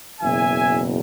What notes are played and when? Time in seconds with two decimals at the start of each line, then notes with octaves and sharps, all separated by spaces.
0.20 F#1 E2 B2 E5 G#5